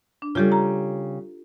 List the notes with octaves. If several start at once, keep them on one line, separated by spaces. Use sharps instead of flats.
D4
C#3 G3 F4 G4 A4
A#5